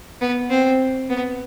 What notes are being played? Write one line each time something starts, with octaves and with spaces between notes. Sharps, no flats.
B3
C4
B3